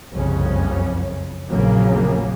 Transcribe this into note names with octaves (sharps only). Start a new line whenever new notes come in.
F#1 C2 F2 C#3 F3 C#4
A#1 F2 C#3 F#3 A#3